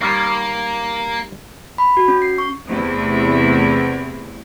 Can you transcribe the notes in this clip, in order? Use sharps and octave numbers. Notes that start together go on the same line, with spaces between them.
D#3 G3 A#3 C#4
B5
F#4
C#4
C7
C#6
E2 C3 A3 E4